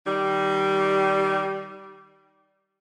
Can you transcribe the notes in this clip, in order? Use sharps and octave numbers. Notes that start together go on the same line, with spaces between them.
D#3 G3